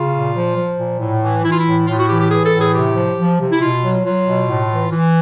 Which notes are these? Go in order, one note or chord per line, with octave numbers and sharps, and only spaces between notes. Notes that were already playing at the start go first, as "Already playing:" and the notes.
Already playing: C#3 F4
A#2
F3
F3
A#2
A2
E3
E3 E4
F4
E4
A2
A2 F4
F#4
E3 G4
G4
E3 G#4
A4
A2
G#4
C3 G4
F3
F3
C3
E4
B2 F4
F#3
F#3 F4
B2
A2
E3
E3